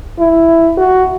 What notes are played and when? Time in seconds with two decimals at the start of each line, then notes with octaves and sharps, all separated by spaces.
0.19 E4
0.77 F#4